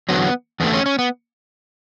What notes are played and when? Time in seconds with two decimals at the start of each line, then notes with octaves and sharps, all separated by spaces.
0.09 E2 D3 F#3 B3
0.60 E2 D3 A3 B3
0.73 C#4
0.86 C#4
0.99 B3